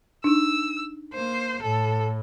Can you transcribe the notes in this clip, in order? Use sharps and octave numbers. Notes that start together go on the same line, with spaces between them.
D4 D#4 E6
A#3 C5
A2 A4